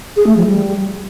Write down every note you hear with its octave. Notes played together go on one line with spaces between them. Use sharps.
G#4
A3
F3
G3